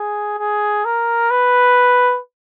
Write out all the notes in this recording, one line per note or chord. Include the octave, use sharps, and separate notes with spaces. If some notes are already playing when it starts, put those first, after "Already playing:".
Already playing: G#4
G#4
A#4
B4